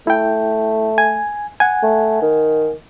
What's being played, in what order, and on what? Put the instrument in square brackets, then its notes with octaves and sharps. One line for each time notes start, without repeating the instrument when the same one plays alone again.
[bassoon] A3 [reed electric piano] E4 G5
[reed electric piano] G#5
F#5 G#5
[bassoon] A3
D#3